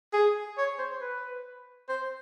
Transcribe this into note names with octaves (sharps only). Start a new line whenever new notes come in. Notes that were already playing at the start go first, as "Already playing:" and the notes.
G#4
C#5
C5
B4
C5